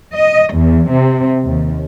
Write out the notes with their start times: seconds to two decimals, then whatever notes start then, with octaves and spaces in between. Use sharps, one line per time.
0.13 D#5
0.54 E2
0.90 C3
1.43 D#2